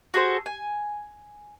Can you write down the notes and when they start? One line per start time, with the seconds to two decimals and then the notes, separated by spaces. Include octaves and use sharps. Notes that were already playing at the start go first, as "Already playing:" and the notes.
0.14 F#4 G#4 A4 C5
0.46 G#5